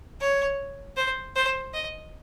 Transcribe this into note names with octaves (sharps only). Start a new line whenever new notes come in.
C#5
C5
C5
D#5